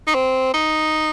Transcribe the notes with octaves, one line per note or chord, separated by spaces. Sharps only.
D#4
C4
D#4